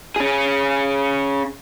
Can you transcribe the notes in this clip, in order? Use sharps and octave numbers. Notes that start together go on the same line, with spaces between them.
C#4 G#4